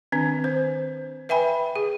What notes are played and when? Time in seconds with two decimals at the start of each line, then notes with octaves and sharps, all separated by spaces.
0.12 D#3 C4 D4
0.44 C5
1.29 B4 E5 G5 G#5 B5
1.76 G#4